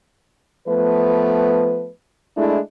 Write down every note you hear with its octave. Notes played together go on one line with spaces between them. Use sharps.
F3 A3 B3 B4
G#3 A3 D4 E4